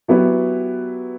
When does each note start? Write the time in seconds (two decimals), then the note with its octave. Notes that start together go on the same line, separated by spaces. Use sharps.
0.08 F#3 B3 E4 G4 B4